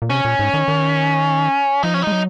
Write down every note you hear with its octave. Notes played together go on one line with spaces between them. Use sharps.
A#2
C3 C#4
A#2
G#2
D#3
D#3
F3 D#4
C#4
D#4
G#3
F#3